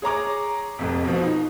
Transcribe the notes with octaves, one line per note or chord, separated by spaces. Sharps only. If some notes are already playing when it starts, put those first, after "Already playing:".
G#4 C#5 A#5 D6
F1 F2
B2 F3
D#4